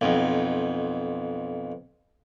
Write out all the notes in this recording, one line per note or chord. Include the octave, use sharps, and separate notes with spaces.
B1 F2